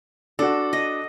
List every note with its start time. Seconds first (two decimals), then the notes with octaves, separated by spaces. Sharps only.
0.39 D4 F#4 A4
0.73 D#5